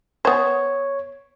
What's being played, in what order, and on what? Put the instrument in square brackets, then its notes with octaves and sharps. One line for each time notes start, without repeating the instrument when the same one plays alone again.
[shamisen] B3 C5 [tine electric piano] C#5